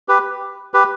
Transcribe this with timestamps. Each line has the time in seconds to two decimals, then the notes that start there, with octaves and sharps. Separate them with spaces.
0.08 G4 B4
0.74 G4 B4